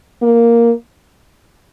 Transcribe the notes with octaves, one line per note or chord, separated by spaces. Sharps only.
A#3